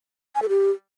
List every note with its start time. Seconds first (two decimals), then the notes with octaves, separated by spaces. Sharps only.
0.35 G#5
0.42 A4
0.49 G4